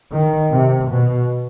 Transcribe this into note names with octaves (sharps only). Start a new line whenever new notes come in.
D#3
C3
B2